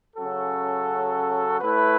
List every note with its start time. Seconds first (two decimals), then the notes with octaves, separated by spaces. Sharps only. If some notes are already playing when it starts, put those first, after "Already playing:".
0.16 C#3 F#3 C#4 F#4 A4
1.61 A2 A3 E4 B4